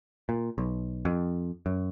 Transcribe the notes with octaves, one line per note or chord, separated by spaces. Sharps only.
A#2
B1
F2
F#2